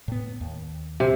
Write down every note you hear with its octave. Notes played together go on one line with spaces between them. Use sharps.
A2 B3
D#2
C3